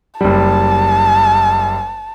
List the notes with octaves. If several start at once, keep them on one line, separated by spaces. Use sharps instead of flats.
F#1 G3 A5